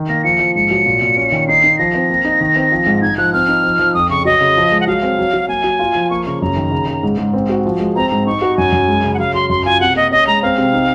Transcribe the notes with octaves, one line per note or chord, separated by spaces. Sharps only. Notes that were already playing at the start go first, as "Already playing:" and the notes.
Already playing: D#3
A#3 A#6
F3 C#7
F3
G#2 C#7
F#3
A#2
A#2
C#4
D#3
D#4 C7
D#4
F3 A#6
C4
A#3
D#4
D#3
C4
F3
G#2
D#4 G#6
F3 F#6
C4 F6
D#4
F3
F3
F2 D#6
C#3 C#6
F#3 D#5
C#3
F3
G#3
F#5
F#3 F5
C4
F#3
F#3
A#3 G#5
F#3
F4
F3
A#3 C#6
C#3 C#6
F#2 A#5
D#3
C#3
C#3
G#2
G#2
C4
F#4
F3
G#3
C4 A#5
G#2 A#5
D#4 C#6
F#4
F#2 G#5
F#2
G#3
C#3
F#5
F#3 F5
F#3 C6
F#2 C6
F4 G#5
C3 F#5
A#3 D#5
C#4 D#5
G#3 A#5
C4 F5
C3
D#4